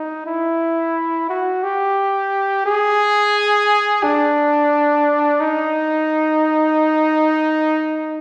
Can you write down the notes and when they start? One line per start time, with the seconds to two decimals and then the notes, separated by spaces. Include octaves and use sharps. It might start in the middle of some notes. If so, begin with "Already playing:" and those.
Already playing: D#4
0.26 E4
1.29 F#4
1.63 G4
2.66 G#4
4.03 D4
5.41 D#4